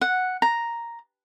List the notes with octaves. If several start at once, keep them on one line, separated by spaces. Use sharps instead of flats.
F#5
A#5